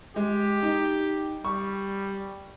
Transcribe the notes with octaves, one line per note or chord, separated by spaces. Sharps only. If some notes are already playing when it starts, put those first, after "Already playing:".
G#3 G4
D#4
G3 C#6